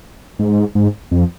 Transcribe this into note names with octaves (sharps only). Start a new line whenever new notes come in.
G#2
G#2
F2